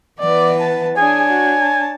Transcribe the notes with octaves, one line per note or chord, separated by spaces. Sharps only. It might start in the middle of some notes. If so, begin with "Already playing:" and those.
E3 B3 B4 D5
A5
D4 G#4 C#5 G#5
F#4
A5